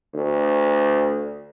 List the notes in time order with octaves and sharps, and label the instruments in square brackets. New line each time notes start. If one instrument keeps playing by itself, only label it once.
[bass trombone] D2